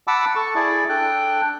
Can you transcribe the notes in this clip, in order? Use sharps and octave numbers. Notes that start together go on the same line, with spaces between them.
F#5 A5 B5 D6 E6
A4 A5 C#6
E4 G#4 D5
D4 A4 G5 F#6